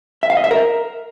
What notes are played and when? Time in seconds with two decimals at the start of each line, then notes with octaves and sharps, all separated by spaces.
0.23 E5
0.30 F5
0.37 D#5
0.44 E5
0.51 A#4